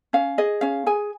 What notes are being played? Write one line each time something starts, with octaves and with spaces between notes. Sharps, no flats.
C#4 F5
G#4 D#5
C#4 F5
G#4 G#5